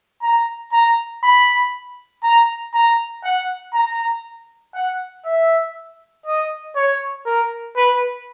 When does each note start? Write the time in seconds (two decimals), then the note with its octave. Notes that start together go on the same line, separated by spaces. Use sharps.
0.22 A#5
0.73 A#5
1.23 B5
2.23 A#5
2.74 A#5
3.24 F#5
3.74 A#5
4.75 F#5
5.25 E5
6.26 D#5
6.76 C#5
7.26 A#4
7.76 B4